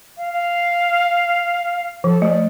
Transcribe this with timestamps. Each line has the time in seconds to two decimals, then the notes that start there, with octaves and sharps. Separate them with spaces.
0.17 F5
0.33 F5
2.04 F3 A4
2.22 A3 D5